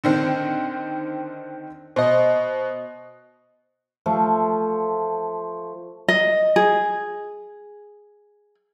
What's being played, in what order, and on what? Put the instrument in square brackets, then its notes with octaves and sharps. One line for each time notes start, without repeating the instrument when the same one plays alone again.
[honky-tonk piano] D3 D#3 C4
[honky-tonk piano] B2 [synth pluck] C5 D#5
[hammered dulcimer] F3 A3
[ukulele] D#5
G#4